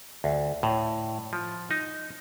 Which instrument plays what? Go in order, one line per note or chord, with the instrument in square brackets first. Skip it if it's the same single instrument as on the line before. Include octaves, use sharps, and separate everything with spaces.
[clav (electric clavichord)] D2
A2
F3
D#4